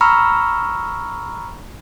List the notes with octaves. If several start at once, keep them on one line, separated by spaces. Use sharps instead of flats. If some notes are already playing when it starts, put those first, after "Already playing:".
A#5 B5 C#6 E6 F6